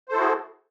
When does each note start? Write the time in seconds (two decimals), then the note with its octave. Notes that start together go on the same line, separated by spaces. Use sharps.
0.09 C5
0.12 A4
0.14 E4
0.17 F#4
0.20 G#4